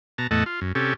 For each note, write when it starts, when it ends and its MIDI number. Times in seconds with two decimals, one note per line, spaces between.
0.18 0.27 47
0.18 0.27 81
0.18 0.27 82
0.31 0.44 40
0.31 0.44 45
0.31 0.44 57
0.31 0.44 75
0.31 0.44 78
0.31 0.44 81
0.46 0.60 65
0.61 0.72 42
0.75 0.94 48
0.75 0.94 61
0.75 0.94 67
0.75 0.94 69